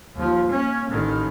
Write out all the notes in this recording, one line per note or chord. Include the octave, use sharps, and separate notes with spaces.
D#2 F3
A#3 C#4
A1 D#3